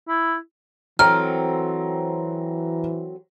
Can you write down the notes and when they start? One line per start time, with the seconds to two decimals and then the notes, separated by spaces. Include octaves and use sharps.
0.08 E4
0.99 E3 F#3 C4 A4 A#5 F6